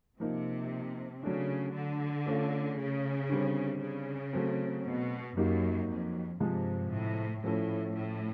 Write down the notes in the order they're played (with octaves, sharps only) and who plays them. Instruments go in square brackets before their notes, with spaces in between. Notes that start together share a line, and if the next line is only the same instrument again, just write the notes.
[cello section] C3 [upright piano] F3 A#3 D#4
[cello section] C#3 [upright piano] F#3 A3 D4
[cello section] D3
[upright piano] A3 C#4 F4
[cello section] C#3
[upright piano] D3 G3 C4
[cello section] C#3
[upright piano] F#3 A3 C4
[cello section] B2
[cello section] F#2 [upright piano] F#3 A#3 D#4 G4
[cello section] F2
[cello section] G2 [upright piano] C3 F3 G#3
[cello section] A2
[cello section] A2 [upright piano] F3 A3 C#4 E4 A4
[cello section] A2